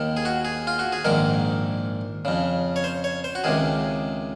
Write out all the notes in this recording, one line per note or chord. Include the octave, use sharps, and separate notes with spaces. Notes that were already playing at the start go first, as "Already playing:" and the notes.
Already playing: D#2 D#3
G#4
F#4
G#4
F4
F#4
G#4
A#1 G#2 D#3 A#4
F2 C#3
C#5
C5
C#5
C5
F#4
C#2 C3 D#3 G#4